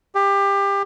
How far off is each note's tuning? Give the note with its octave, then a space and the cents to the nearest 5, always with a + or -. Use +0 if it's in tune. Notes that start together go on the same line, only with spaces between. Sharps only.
G4 +25